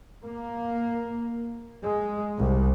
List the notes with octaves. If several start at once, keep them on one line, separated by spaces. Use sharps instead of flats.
A#3
G#3
C2